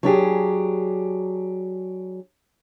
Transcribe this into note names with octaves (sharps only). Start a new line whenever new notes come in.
F#3 D4 G4 G#4